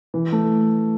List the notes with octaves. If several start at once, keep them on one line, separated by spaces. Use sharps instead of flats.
E3
A3